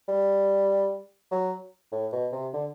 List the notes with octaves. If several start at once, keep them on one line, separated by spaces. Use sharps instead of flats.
G3
F#3
A2
B2
C3
D3